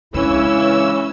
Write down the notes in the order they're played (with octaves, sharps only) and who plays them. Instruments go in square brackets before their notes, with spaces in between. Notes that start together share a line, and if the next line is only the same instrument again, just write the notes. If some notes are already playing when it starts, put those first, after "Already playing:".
[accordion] C#3 E3 E6 [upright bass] G#3 D4 [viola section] C#4 [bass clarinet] E4